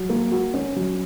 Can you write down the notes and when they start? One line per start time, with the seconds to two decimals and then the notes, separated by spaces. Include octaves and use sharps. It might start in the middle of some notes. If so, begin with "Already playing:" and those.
Already playing: F#3
0.10 A#3
0.31 F#4
0.54 C#4
0.76 F#3